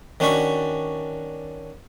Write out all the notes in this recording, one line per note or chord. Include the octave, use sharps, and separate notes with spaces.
D#3 C#4 D4 F#4 B5 C#6